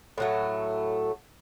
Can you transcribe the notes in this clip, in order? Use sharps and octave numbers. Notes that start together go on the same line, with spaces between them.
A2 F#3 A3